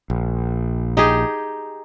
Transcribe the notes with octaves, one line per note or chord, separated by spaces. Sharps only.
A#1
D#4 G4 G#4